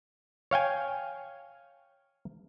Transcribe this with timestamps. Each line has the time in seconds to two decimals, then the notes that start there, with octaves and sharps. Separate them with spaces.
0.51 C#5 F5 G5 G#5